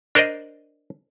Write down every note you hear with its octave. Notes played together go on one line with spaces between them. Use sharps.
D4 A#4 C5 D5 D#5